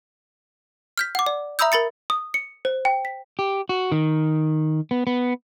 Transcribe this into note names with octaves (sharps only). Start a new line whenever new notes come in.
F6 G6 B6
F#5 D6
D5
E5 A#5 B5 D#6 E6 G6
A#4 B5 A6 C#7
D#6
C#7
C5
G5
B6
G4
F#4
D#3
B3
B3